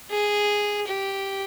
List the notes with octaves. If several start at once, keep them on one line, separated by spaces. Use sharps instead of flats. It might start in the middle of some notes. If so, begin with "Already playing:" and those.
G#4
G4